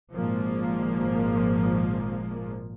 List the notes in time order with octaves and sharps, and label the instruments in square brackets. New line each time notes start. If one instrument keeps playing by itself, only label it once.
[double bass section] G#1 A#2 F3 G#3 A#3